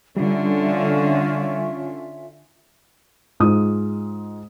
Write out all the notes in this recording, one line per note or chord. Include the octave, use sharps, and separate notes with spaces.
D3 G3 C#4 F4 E5
G#2 G#3 F4 D#6